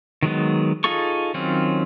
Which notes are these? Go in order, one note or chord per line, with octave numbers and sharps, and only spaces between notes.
D#3 F#3 G#3 B3
D#4 F4 G#4 A4 C#6
D#3 F#3 C4 C#4 F4